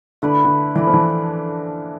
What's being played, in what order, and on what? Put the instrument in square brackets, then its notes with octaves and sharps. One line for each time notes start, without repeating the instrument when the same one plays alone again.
[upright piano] D3 [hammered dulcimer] A3 E4 B4 D5
[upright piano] D3
[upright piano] E3 [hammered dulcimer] A3 E4 B4 D5
[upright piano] F3
E3